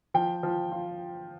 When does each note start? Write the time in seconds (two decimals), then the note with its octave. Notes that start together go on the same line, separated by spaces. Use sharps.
0.14 F3 G5
0.43 F3
0.72 F4